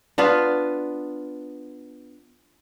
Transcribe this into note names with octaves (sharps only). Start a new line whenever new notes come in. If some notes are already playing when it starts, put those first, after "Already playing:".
B3 D4 F4 B4